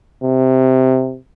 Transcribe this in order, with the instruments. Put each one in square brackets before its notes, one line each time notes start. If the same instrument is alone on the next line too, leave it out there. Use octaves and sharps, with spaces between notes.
[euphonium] C3